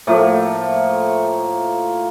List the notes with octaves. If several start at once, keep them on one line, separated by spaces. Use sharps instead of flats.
A2 F3 A3 A#3